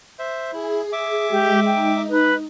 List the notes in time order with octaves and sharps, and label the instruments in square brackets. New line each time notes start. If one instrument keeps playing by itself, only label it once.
[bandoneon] C5 E5
[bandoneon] E4 [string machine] G#4
[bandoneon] E5 D6
[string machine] G#3 [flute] G4
[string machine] D#4 [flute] G5
[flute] B4